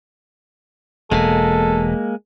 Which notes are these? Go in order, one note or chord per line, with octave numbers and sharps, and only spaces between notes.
E1 B2 G#3 A#3 A4